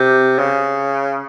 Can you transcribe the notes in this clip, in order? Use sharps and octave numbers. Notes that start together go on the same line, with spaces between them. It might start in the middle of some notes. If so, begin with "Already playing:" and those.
Already playing: C3
C#3